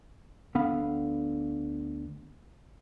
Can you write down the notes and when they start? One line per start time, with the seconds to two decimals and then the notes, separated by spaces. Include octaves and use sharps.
0.55 D2 D3 B3 F5 B5